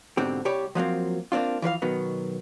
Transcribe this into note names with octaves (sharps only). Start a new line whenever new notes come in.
G#2 B2 D3 C4 G4
C2 G3 G4 C#5
F3 F#3 A#3 C4
A#3 C4 D4 F4
E3 F3 B4 F5
B2 D#3 F#3 B3